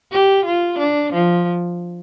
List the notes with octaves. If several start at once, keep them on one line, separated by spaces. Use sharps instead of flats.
G4
F4
D4
F3